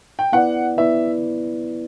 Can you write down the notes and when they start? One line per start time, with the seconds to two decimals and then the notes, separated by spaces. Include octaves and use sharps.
0.19 G5
0.32 B3 E4 B4 D5 F#5
0.78 B3 E4 B4 D5 E5